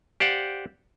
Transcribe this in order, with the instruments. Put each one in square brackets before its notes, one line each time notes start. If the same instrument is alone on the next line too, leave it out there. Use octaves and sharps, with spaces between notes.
[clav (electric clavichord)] G4 C5 D5 F5 F#5